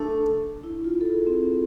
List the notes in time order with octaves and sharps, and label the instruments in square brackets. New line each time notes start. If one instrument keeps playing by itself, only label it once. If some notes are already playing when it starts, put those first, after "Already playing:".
Already playing: [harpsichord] A3 [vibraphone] D4
[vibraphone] E4
F4
A4
G#4
C4